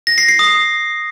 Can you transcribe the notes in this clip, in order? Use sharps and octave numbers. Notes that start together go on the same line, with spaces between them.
A#6
C7
C7
D#6